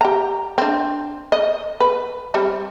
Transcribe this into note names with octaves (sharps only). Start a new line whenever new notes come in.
G4 A#5
C4 D4
D#5
B4
G3 C4